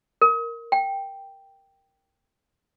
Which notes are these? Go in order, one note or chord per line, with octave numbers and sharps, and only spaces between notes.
A#4
G5